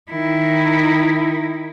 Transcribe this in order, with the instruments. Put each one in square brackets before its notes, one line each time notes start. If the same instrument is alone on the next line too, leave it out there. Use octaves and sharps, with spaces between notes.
[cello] D#3 E4